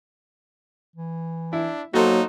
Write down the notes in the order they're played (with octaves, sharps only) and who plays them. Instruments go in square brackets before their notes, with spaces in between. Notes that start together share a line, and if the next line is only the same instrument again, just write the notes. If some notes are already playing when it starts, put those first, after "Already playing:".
[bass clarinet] E3
[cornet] D4 [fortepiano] E4
[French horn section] F#3 [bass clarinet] A#3 [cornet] D#4 [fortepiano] F#4 A4 C5